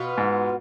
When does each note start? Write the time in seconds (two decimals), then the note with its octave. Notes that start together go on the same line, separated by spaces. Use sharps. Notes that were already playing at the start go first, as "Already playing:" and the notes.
Already playing: B2 B3 F4
0.18 G#2